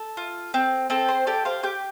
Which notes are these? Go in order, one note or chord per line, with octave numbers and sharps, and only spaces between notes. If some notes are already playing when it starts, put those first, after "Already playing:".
Already playing: A4
F4
C4
C4 A4
C5
G4 A4 D5
C5 F5
G4 D6 G6